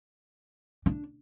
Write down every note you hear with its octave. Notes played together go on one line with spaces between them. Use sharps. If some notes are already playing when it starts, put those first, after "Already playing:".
D4